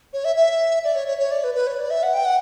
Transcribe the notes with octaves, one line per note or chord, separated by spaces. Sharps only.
C#5
E5
E5
D5
C#5
C#5
C#5
D5
B4
B4
C#5
D5
E5
F#5
G5
F#5